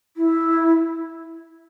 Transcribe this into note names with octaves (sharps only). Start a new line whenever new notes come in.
E4